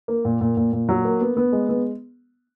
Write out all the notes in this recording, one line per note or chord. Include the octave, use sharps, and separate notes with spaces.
A#3
A#2
A#2
A#2
A#2
F#3
A#3
B3
B3
G#3
B3